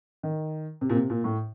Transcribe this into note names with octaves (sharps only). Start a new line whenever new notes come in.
D#3
C3
A#2
C3
A#2
A2